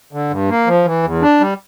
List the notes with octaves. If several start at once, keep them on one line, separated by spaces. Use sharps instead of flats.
D3
G2
A#3
F3
E3
E2
D4
G3